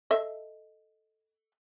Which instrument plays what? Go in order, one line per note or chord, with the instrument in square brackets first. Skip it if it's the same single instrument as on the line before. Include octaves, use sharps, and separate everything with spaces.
[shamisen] A4 D#5 E5